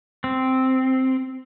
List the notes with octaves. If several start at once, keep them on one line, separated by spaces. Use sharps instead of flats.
C4